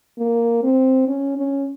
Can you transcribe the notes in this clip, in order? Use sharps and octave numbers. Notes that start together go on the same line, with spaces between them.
A#3
C4
C#4
C#4